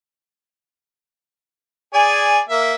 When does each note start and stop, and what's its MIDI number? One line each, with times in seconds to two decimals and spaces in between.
1.94 2.39 68
1.94 2.39 74
1.94 2.39 80
2.49 2.75 58
2.49 2.75 76